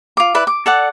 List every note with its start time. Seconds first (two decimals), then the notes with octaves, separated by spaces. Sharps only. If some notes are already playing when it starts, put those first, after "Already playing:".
0.17 F4 D6
0.34 E4 B4 D5
0.47 D6
0.66 A4 D5 F#5